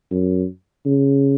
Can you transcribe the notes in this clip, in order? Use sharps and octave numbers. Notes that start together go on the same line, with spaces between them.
F#2
C#3